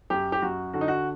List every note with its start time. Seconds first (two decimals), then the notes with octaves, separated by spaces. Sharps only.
0.10 F#2 G4
0.32 G4
0.42 F#2 F#4
0.73 D3 F#4
0.81 D#4
0.88 F#4